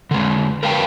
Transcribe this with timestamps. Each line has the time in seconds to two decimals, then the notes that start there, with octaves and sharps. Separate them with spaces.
0.11 D3 G#3
0.63 A#4 B4 F5 G5 A5